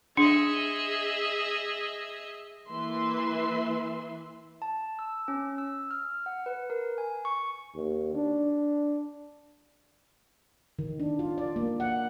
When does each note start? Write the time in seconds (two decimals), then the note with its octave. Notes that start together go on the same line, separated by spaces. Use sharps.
0.17 D4 G#4 D#5 E5
2.69 E3 A#3 B4 E5 C6
4.62 A5
4.99 E6
5.28 C#4
5.58 E6
5.91 F6
6.26 F#5
6.46 B4
6.70 A#4
6.98 G#5
7.25 C#6
7.75 D#2
8.15 D4
10.79 D#3
11.00 D4
11.19 F4
11.38 D5
11.56 A#3
11.80 F#5